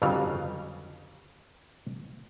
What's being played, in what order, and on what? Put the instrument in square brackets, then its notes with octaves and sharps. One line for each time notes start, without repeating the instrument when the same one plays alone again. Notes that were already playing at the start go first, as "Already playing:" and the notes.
[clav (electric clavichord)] G1 F2 C#3 F#3 G3 F5